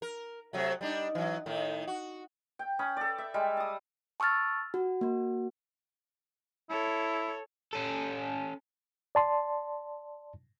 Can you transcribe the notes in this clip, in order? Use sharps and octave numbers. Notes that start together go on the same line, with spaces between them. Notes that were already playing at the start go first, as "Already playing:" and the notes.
A#4
C3 F#3 A3
G3 D4 D#4
E3 F#3
A2 D#3
F#4
G5
C#4 B5 D#6
A4 D5
E5
G3 G#3
A5 D#6
A5 C#6 E6 F6 A6
F#4
A#3 F#4
E4 A4 C#5
C#4 A4
D5 A5 C6